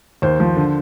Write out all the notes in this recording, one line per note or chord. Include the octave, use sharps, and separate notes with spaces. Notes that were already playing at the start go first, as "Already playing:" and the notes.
D#2 C5
F3
D3